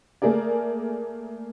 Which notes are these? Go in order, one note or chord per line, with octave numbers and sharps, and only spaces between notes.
A3 A#3 G#4 A#4 D5